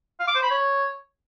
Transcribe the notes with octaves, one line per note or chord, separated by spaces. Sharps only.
F5
D6
C5
B5
C#5